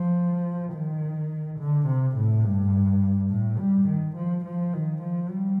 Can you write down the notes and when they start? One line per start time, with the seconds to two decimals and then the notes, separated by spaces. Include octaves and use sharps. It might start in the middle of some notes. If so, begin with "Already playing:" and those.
Already playing: F3
0.73 D#3
1.59 D3
1.87 C3
2.17 A2
2.44 G2
3.31 A2
3.59 G3
3.87 D#3
4.16 F3
4.45 F3
4.73 D#3
5.02 F3
5.30 G3